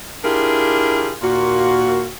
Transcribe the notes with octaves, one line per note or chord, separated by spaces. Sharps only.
D4 E4 F4 G4 G#4 A#4
D#2 A#2 A#3 F4 F#4